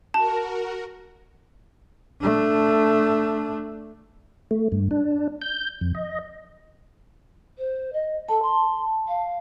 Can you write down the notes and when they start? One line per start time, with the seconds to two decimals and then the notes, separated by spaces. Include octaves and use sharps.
0.14 F#4 A#4 A5
2.20 A3 D4
4.51 A3
4.72 G2
4.91 D4
5.42 G6
5.81 F2
5.95 D#5
7.58 C5
7.92 D#5
8.29 A4 A5
8.42 C6
9.08 F5